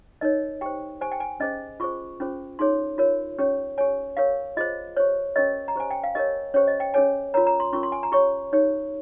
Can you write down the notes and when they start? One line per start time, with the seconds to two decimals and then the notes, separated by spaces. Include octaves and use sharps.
0.21 D#4 A#4 C#5 D#5
0.61 G4 C5 G5
1.01 G4 C5 G#5
1.12 G5
1.20 G#5
1.40 C#4 G#4 C5 D#5
1.80 F4 G#4 C5 C#6
2.20 C#4 F4 G#4 C5
2.59 D#4 G#4 C#5 C6
2.98 F4 A#4 C#5
3.38 C#4 G4 C#5
3.78 G4 C#5 G#5
4.17 G4 A#4 C#5 F5
4.57 F4 G#4 C5 D#5
4.97 G4 C5 C#5
5.36 C#4 G4 A#4 C#5 D#5
5.68 A#5
5.76 G4 C5 G#5
5.91 G5
6.04 F5
6.15 G4 A#4 C#5 D#5
6.54 C#4 G4 C5 C#5
6.67 D#5
6.80 G5
6.94 C#4 G#4 C#5 G#5
7.34 F4 A#4 C#5 A#5
7.47 A#5
7.60 C6
7.73 C#4 F4 A#4 C#6
7.83 C6
7.92 G#5
8.03 A#5
8.12 G4 C#5 C#6
8.52 D#4 G4 C#5